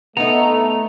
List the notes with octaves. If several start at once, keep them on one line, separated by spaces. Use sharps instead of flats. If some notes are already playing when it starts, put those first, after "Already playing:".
A3 B3 D#4 A#5